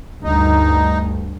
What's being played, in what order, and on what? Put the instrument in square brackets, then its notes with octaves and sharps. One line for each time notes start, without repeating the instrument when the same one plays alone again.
[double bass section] D2 G2 [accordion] D#4